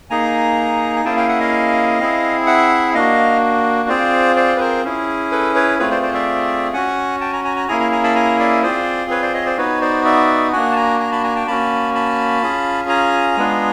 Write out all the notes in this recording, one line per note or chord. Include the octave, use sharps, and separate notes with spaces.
A#3 D#4 G#4 G#5 A#5
G#5
A#3 C#4 E4 G#4 G5 A5
F5 G5
E5 F#5
D#5 F5
C4 E4 G#4
E5 F#5
A#3 D4 F#4 D#5 F5
C4 F4 G#4 C5 D5
C5 D5
B4
A#4 C5
C#4 E4 G#4
A4 B4
B4 C#5
A3 C4 F4 G#4 B4 C#5
C5 D5
C5 D5
D5 E5
C#4 F#4 F#5 G#5
G5 A5
G#5 A#5
G#5 A#5
G#5 A#5
A#3 C#4 E4 G#4 G#5 A#5
G#5 A#5
G#5 A#5
A5 B5
G#5 A#5
D5 E5
C4 F4 G#4 C5 D5
B4 C#5
C5 D5
C#5 D#5
C5 D5
B3 D#4 F#4 B4 C#5
C5 D5
D5 E5
A#3 D4 F#4 F#5 G#5
A5
G#5 A#5
G#5 A#5
A5 B5
G#5 A#5
G5 A5
A#3 C#4 F#4 A5 B5
A5 B5
C#4 F4 G#4
G#5 A#5
G#3 B3 D4 F4 G#4